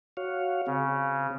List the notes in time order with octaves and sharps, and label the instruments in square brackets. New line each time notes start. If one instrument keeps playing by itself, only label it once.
[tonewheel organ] F#4 C#5 F5
[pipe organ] C#3 [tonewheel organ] C4